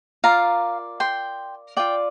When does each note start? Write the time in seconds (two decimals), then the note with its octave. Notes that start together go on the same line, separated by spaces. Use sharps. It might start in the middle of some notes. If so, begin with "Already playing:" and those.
0.24 F4 A#4 D5 F5 A#5
1.00 G5 C6
1.77 F4 D5 G5